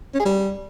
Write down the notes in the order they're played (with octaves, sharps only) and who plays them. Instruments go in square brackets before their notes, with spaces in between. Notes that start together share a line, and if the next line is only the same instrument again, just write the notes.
[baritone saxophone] C#4
G#4
G3